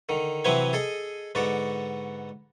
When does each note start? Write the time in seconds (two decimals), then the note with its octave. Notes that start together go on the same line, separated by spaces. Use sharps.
0.09 D3 D#3
0.45 C3 E3 F#3 C4 B4 G#5
0.73 G#4 A4 D#5
1.35 G#2 D3 B3 F#4 D5